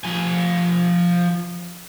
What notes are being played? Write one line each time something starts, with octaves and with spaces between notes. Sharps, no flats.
F3 G#5